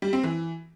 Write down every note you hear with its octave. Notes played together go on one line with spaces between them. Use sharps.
G3
C4
E3